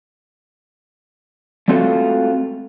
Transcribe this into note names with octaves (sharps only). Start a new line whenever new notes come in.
G#3 A3 C4 F4 F#4 A4